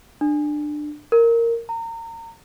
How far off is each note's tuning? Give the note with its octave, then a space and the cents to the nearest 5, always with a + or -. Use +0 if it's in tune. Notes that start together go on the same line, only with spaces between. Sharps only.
D4 +20
A#4 -10
A#5 -30